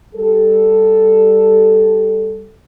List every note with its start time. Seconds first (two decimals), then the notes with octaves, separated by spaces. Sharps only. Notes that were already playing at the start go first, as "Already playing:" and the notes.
0.15 G3 A4